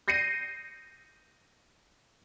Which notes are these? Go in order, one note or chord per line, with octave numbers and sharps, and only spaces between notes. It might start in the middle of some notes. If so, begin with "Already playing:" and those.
G6 A#6 C7 C#7 D#7